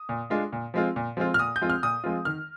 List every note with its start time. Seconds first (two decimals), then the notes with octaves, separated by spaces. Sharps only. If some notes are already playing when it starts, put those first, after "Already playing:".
Already playing: D#6
0.09 A#2
0.30 G#3 D4 F4
0.52 A#2
0.74 F3 G#3 C4 F4
0.96 A#2
1.17 F3 G#3 C4 F4
1.34 F6
1.39 A#2 D#6
1.56 G6
1.61 F3 G#3 C4 F4
1.70 F6
1.83 A#2 D#6
2.04 F3 G#3 C4 F4
2.25 D#3 F6